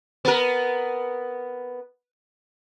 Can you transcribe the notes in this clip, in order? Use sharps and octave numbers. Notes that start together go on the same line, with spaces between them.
B3 A#4